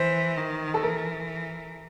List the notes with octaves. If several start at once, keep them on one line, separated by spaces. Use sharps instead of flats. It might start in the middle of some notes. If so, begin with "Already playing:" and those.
Already playing: E3 C5
D#3
A4
E3 A#4